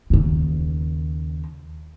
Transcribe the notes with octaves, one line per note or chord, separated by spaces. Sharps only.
D#2 C#3